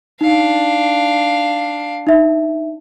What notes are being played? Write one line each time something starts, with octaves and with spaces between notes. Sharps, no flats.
D4 D#4 F5
D#4 E5